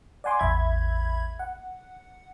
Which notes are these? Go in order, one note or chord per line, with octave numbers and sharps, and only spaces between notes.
D5 F#5 G#5 C6 D6
A1 E2 E5 B5 G#6
F#5